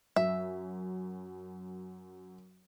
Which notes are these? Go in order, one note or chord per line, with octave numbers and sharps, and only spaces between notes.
F#2 E5